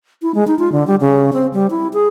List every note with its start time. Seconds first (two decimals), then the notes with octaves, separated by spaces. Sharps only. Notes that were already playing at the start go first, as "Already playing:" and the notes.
0.22 E4
0.35 G#3
0.47 D#4
0.59 F4
0.72 D3
0.87 G3
1.01 C#3
1.33 C4
1.54 G3
1.71 E4
1.93 G#4